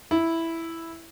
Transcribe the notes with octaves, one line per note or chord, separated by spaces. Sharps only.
E4